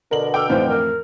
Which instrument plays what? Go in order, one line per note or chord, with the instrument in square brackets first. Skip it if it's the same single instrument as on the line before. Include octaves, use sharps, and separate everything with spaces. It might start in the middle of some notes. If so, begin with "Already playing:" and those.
[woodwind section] B2 D3 [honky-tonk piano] A#4 F#7
[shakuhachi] A4 [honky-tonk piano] G5 D6 F6
[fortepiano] F2 A2 E3 [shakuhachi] C5
[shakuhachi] A#4